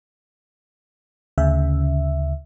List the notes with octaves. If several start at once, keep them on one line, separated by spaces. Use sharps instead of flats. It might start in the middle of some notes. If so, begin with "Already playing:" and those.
D2 C#3 E5